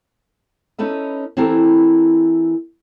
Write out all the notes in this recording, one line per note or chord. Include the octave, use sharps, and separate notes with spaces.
C#4 D#4 A4 B4 E5
E3 C4 E4 G4 A4 A#4